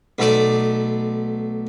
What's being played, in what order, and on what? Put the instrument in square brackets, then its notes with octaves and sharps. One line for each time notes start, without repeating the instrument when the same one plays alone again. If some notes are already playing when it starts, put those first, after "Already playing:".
[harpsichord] B1 A3 D5